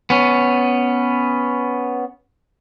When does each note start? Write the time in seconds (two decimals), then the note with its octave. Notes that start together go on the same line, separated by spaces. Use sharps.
0.10 B3 C#4